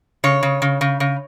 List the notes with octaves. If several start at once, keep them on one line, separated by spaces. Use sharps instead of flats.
C#3 C#5
C#3
C#3
C#3
C#3